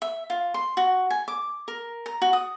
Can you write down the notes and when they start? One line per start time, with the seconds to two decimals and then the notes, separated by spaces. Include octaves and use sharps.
0.02 E5
0.30 F4
0.54 C6
0.77 F#4
1.10 G#5
1.28 D6
1.68 A#4
2.06 A#5
2.22 F#4
2.33 D#6